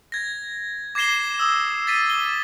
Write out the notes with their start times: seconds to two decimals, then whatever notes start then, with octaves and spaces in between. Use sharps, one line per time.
0.12 G#6 A#6
0.95 D6 G#6 A#6 C7 E7 G7
1.39 D#6 E6
1.87 A6 B6 D#7
2.10 D6 G7